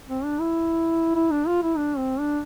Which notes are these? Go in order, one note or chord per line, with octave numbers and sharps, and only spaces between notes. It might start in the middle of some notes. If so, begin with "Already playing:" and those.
C4
D4
E4
E4
D4
F4
E4
D4
C4
D4